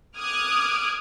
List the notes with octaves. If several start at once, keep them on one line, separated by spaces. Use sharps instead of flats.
D6 D#6 F6 F#6 G#6